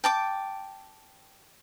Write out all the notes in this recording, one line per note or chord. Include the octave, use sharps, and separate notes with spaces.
G5 A5 D6